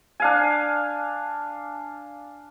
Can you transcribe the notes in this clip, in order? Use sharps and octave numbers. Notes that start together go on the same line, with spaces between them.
D4 F5 G#5